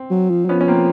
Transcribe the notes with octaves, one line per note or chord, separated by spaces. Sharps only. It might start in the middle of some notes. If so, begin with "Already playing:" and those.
Already playing: C4
F#3
F3
F#3
F3 B3 C#4
C#4
A#3 C4